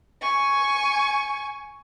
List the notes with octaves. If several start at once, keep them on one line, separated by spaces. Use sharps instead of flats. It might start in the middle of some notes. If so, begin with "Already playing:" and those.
G#5 C#6